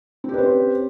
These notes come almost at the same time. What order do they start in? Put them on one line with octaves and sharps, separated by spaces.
C4 G4 B4 C5 C#4